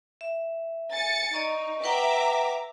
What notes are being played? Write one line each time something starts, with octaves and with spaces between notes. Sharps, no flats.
E5
G#5 A6 C#7
D#4 D5 D#5 C#6
B4 E5 F#5 G5 A#5 D6